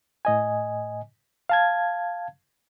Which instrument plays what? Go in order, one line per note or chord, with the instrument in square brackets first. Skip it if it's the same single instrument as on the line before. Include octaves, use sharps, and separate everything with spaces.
[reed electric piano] A2 D#5 G#5
F5 A5 G#6